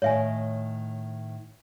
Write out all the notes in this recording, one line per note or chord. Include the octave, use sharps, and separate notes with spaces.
A2 D#3 C#5 E5 G#5